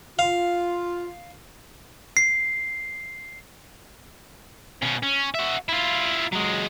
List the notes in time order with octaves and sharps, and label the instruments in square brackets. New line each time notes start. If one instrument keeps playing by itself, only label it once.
[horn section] F4 [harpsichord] F5
[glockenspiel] C7
[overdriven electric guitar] B2 C#4
C#4
F#4 E5
E4 F4
F#3 G#3